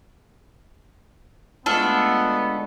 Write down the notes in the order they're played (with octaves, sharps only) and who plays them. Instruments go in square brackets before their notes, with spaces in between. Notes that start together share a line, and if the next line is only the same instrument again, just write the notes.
[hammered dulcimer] D3 G#3 A3 [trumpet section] B3 [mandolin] D4 F4 A4